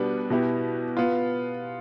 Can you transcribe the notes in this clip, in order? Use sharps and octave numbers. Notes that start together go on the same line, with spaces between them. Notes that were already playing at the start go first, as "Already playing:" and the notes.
Already playing: B2 G3 B3 D4
B2 B3 E4 G4
B3 F4